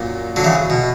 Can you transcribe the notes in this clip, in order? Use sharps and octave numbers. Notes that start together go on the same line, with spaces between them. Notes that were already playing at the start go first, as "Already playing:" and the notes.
Already playing: F#2 A#2
D3 F#3
C#3 E3
B2